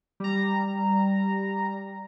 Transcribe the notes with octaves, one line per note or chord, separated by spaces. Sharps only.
G3 A#5